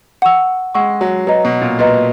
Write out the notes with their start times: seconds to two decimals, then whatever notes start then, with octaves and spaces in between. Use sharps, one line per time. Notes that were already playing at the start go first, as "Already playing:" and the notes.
0.22 F#5 C#6 E6
0.75 G#3 F#5 C#6 E6
1.01 F#3
1.27 F#3 B4 D#5 A#5
1.45 B2
1.62 A#2
1.79 A#2 B4 D#5 A#5